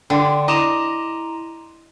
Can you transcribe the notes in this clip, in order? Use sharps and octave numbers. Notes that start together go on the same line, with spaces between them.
D3 G5 C6 D6
E4 D#5 A#5 C6 D6 E7 F7